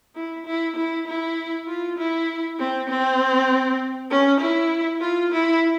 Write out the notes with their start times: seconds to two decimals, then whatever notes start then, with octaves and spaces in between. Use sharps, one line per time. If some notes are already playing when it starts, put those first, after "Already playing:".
0.15 E4
0.46 E4
0.76 E4
1.07 E4
1.67 F4
1.98 E4
2.59 C4
2.89 C4
4.10 C#4
4.40 E4
5.01 F4
5.32 E4